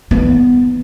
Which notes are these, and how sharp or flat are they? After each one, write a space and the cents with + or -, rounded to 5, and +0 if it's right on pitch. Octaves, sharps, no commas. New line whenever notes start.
D#3 +30 B3 +5